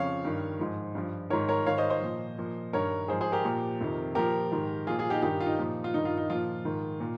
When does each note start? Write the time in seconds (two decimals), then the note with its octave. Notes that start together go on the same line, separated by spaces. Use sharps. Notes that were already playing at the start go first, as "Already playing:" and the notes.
Already playing: F2 C#3 F3 C#5 F5
0.25 G2 D#3
0.59 G#2 F3
0.95 G2 F3
1.30 G#2 D#3 A#4 C#5
1.48 A#4 C#5
1.66 G#2 D#3 C#5 F5
1.78 C5 D#5
1.90 C5 D#5
2.01 A#2 F3
2.38 A#2 F3
2.73 G2 D#3 A#4 C#5
3.08 G#2 G#4 C5
3.13 F3
3.21 G#4 C5
3.32 G4 A#4
3.45 A#2 F3
3.81 F2 C3 D#3
4.15 A#2 F3 G4 A#4
4.52 G#2 D#3
4.87 A#2 F3 F4 G#4
4.99 F4 G#4
5.10 D#4 G4
5.22 G2 D#3 D#4 G4
5.40 F4
5.46 D#4
5.59 A#2 F3
5.84 F4
5.94 G2 D#3 D#4
6.05 F4
6.17 D#4
6.30 A#2 F3 F4
6.65 G#2 D#3
7.00 A#2